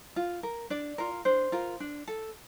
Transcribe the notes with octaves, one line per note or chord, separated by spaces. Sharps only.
F4
A#4
D4 D5
F4 A#4
D4 C5
F4 A#4
D4
A4